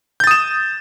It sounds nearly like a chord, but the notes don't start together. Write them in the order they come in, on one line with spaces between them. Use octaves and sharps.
G6 A6 D#6 E7